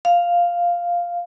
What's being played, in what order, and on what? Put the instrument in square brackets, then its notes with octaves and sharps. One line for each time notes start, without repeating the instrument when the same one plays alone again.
[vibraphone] F5